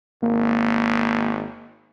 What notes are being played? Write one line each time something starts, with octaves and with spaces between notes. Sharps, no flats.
G#1 A#3